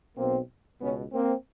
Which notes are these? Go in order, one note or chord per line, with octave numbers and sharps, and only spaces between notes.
B1 B2 A#3 C4
C#2 B2 B3 C#4
A#3 C4